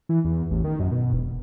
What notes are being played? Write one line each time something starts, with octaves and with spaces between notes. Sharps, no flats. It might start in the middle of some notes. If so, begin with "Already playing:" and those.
E3
E2
A1
D#3
F#2
B2
E1